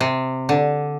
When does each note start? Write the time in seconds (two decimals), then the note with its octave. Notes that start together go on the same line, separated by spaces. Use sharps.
0.01 C3
0.49 D3